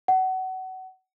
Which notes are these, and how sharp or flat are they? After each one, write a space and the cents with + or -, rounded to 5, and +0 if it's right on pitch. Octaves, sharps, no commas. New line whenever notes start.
F#5 +25